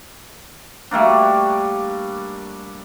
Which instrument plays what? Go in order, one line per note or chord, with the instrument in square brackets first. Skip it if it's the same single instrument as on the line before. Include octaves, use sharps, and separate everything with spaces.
[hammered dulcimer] G3 A3 A#3 D4